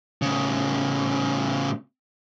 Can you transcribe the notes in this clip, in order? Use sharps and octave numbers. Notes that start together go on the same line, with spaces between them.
A2 C#3